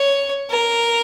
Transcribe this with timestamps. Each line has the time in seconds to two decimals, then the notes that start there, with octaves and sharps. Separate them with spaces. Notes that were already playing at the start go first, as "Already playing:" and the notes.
Already playing: C#5
0.50 A#4